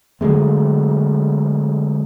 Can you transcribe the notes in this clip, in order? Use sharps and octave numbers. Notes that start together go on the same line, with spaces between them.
D3 F#3 G#3 A3